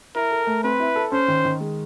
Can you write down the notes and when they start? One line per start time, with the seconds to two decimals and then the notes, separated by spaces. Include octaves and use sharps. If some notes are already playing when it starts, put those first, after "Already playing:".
0.15 E4 A#4
0.31 A4
0.47 A3
0.63 C4 B4
0.80 E4
0.96 A4
1.12 C#4 C5
1.28 D#3
1.45 D#3
1.60 G#3